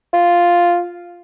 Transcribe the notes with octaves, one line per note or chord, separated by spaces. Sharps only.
F4